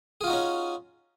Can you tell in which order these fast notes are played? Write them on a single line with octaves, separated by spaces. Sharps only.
G#4 F4 F#4 D#4 C#4